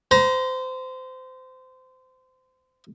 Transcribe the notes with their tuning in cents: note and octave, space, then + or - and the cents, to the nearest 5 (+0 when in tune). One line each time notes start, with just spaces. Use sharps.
C5 -25 A#5 +25